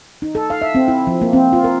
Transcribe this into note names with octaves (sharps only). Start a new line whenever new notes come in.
D#4
A4
F5
E5
C4
E4
F3
A#3
C4
F4
A#4